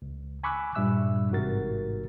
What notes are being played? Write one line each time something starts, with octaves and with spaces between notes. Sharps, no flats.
C#2
G#5 B5 C#6 D6 E6 F#6
G2 A#2 G3 E5 E6 F#6
A1 G#2 C3 F#4 A#4 A6